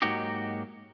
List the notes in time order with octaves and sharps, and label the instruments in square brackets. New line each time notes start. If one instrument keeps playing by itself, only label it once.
[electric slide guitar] G#2 F#3 A#3 D#4 F#4 G4